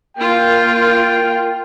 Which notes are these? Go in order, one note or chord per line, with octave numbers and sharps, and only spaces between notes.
A#3 F4 G5